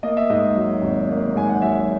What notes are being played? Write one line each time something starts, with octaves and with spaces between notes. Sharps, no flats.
A#3 D#5
E5
G#2 D#5
F#3
G#1
A#3
G#2 G#5
F#5
F#3 E5